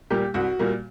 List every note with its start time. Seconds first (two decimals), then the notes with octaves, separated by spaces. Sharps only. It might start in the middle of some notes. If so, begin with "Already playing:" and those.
0.10 A#2 G3 A#3 G4
0.34 C2 F#4
0.59 A#2 G3 A#3